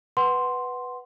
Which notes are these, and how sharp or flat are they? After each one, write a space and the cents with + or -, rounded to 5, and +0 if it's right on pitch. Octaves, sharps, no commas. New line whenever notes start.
B4 +0 F#5 +10 C6 +0